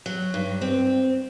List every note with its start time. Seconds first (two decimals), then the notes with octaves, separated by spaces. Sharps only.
0.06 F#3
0.34 G2
0.61 C4